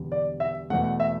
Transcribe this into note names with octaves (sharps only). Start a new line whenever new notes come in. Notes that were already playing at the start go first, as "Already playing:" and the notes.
Already playing: E1 E2 D3 G3 B3
D5
E5
E2 B2 A3 F#5
F#5
E5